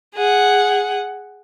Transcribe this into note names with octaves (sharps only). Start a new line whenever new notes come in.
G#4 F#5